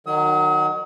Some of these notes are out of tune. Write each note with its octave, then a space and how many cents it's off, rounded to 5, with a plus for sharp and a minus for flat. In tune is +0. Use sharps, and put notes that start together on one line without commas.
D#3 -25 F#3 +0 D#6 +40